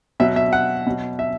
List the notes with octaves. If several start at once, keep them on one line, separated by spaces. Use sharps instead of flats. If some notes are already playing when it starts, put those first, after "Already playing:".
B2 F#3 E5
E5
F#5
B2 F#3
E5